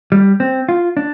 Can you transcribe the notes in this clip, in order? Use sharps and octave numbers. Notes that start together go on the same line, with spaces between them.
G3
C4
F4
D4